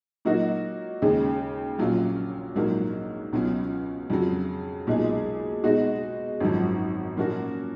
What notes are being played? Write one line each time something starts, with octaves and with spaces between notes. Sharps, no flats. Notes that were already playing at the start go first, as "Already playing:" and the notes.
A#2 F#3 A#3 D#4 F#4
D#2 C#3 G#3
A#1 A#2 F#3 C#4 F4
A#1 G#2 F#3 A#3
C#2 B2 F#3 C#4
F2 C#3 F#3
B1 A#2 G#3 D#4 G#4
B2 G#3 D#4 F#4
G#1 F#2 F3
A#2 F3 A#3 C#4 F#4